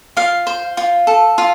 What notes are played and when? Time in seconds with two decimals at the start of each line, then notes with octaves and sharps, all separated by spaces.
0.17 F4 F5
0.47 C5
0.77 F4
1.07 A4
1.38 F4